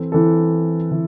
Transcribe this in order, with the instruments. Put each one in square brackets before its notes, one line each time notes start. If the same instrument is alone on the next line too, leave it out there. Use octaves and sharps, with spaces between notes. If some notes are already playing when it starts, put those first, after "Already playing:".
Already playing: [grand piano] E3 C4 A4
E3 C4 E4 A4
E3